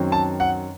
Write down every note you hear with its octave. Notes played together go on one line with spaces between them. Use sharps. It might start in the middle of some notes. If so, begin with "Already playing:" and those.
Already playing: F#2 D#3 F#3 C4
A5
F#5